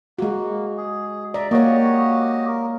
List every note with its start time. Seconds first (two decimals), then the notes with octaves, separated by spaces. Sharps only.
0.19 G#3 A#3 F#4
0.77 G#4
1.34 D5 E5 A#5
1.51 A#3 F#4 G4 C#5 D#5
2.48 A#4